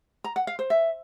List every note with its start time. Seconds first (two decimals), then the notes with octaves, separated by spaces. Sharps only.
0.24 A#5
0.36 F#5
0.47 F5
0.59 C5
0.70 E5